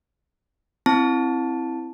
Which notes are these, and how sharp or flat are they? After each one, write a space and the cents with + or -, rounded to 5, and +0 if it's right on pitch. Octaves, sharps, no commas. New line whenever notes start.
C4 +0 E4 +0 A5 +0